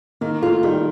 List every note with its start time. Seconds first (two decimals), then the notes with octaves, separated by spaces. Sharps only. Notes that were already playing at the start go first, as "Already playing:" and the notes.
0.21 D#3 A#3
0.42 A3 F4
0.63 D#3 G3